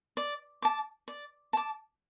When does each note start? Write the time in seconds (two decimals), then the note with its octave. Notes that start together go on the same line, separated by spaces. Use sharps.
0.17 D5
0.62 A5 D6
1.08 D5
1.53 A5 D6